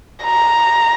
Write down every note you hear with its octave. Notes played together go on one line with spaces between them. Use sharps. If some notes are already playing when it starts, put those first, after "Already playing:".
A#5